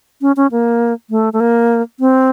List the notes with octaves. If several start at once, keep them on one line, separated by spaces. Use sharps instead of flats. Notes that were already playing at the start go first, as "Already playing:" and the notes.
C#4
C#4
A#3
A3
A3
A#3
C4